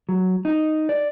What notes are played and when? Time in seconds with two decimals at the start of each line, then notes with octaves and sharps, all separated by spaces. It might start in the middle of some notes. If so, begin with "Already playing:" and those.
0.09 F#3
0.45 D#4
0.89 D5